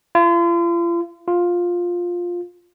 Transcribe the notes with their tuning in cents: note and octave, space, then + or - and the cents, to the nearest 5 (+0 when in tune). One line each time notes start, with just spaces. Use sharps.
F4 -40
F4 +10